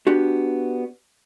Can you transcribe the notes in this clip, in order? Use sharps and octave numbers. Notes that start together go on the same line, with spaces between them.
B3 D4 F#4 G4